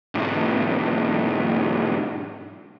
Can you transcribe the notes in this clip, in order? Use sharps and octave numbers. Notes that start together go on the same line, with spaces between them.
B1 G#2